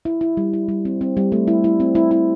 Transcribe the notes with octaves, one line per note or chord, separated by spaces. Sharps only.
E4
E4
G3
E4
G3
C4
C4
G3
A3
E4
E4
C4
E4
E4